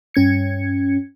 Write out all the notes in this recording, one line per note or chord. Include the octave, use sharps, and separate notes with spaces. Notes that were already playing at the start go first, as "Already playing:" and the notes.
G2 C#4 G#6 C#7